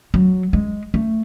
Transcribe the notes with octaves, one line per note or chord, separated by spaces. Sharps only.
F#3
G#3
A3